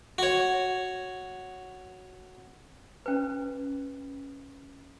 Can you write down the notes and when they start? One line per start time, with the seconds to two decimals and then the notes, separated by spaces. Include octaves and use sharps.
0.18 F#4 C#5
3.06 C#4 B4